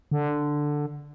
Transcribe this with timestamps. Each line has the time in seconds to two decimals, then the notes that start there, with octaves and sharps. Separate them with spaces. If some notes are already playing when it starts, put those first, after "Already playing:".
0.11 D3